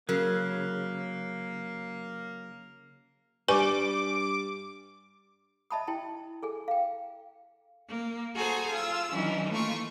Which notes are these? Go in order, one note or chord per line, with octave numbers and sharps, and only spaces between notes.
C#3 F#3 A#3 A#4
G2 G3 B4 G#5 C#6 D6
D#5 E5 A5 B5 D#6
E4 G5 A5
G#4 A4 G#5
F5 G5
A#3
F#4 G#4 A4 C5 G#5 A#5
F4 E6
D#3 E3 F#3 C#4 D4
A3 A#3 F4 C#6